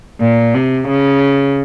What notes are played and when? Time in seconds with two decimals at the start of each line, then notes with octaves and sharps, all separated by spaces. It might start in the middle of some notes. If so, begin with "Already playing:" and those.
0.20 A#2
0.54 C3
0.89 C#3